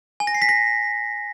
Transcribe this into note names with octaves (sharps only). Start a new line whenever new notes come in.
G#5
A#6
C7
B6
A#6